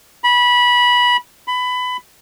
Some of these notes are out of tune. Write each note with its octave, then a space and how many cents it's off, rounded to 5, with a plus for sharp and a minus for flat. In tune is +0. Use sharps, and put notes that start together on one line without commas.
B5 -20
B5 +20